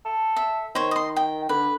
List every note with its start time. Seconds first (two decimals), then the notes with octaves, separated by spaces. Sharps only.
0.05 A4
0.36 E5
0.75 D#3 C5 C#5
0.91 D#5 C6
1.16 G5
1.49 D3 B4